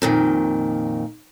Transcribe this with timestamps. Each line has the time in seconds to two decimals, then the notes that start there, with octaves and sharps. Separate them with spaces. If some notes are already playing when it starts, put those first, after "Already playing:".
0.02 F2 A#2 D#3